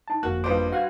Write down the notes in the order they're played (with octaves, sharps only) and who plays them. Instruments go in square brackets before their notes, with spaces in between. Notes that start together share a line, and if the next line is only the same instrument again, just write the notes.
[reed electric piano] D#4 A5
[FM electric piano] G1 F2 A#3 [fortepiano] F#4 [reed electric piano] F#6
[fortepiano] G2 B4 C5 [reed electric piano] F4 D#5 D6
[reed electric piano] F#4 C6 F#6 [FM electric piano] F5 G#6